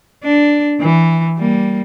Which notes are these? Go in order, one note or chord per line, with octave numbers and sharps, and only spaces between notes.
D4
E3
G3 A#3